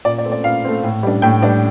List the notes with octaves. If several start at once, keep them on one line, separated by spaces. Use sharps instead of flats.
A#2 D5
D5
A3 C4
D5
A#2 F5
A3 C4
A2
G3 D4
A2 G5
G3 D4